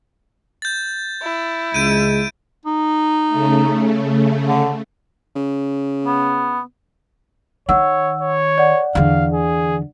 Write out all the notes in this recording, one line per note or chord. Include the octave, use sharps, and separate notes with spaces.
G6 A6
E4
C#2 G#3 G6 D7 D#7
D#4
C#3 A3
D3
C#3
B3
D#3 C#5 F#5 E6
C#5
D5 F#5
E2 D3 F5
G#4